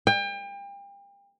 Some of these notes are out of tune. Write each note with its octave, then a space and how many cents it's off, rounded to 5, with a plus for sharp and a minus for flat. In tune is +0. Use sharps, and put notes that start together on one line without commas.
G5 +35